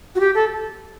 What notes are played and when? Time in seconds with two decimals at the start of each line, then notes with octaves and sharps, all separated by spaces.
0.15 F#4
0.20 G4
0.34 A4